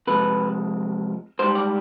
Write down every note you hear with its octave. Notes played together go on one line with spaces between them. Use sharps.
C3 F3 G#3 B4
G#2 G3 C5
D5